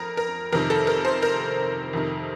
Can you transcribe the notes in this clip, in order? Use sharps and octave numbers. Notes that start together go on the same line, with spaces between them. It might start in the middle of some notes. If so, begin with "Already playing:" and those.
Already playing: F2 A#4
A#4
F2 C3 D#3 A#4
A4
A#4
C5
A#4
F2 C3 D#3